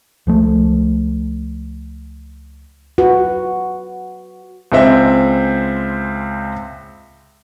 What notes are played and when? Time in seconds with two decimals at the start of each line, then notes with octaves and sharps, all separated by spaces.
0.27 C#2 F3 A3
2.98 F#4 B4
4.72 C#2 G#3 C4 C5 E5